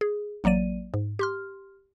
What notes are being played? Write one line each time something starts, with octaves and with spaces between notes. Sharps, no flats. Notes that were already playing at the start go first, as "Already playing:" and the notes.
G#4
A1 F#3 A#3 D5 D#7
G#2
G4 C6 F6